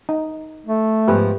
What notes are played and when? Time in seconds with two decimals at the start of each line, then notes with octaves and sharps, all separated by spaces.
0.09 D#4
0.66 A3
1.08 G#2 F3 B3 G4 B4